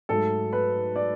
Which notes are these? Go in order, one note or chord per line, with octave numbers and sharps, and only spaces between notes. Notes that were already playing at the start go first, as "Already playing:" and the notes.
G#2 F#3 A3 A4
B4
D5